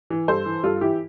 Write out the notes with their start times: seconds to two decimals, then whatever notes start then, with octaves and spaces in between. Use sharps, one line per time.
0.10 E3
0.28 G2 A4 C5
0.46 E3
0.63 G2 F4 A4
0.81 E3 E4 G4